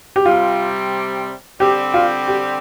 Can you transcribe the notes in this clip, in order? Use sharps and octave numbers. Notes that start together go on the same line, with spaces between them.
G4
C3 G3 C4 F4
D3 G3 C4 G4
F4
G4